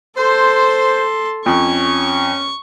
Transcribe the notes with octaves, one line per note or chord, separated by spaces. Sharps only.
A4 C5 C6
F2 C#4 C#6